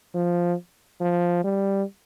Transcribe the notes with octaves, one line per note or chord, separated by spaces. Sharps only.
F3
F3
G3